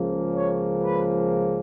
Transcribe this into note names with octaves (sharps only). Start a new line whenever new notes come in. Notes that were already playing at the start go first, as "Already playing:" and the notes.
Already playing: C#2 C#3 F3 A#3
C#5
B4